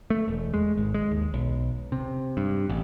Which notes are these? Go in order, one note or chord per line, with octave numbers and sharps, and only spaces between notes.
A3
E1
G#3
G#1
G#3
D#2
B1
C3
G2
A1